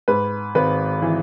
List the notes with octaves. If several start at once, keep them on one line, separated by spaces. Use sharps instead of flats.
G#2 B4
G#1 B4
E3